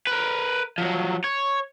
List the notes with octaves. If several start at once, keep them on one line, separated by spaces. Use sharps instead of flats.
A#4 B4
F3 F#3
C#5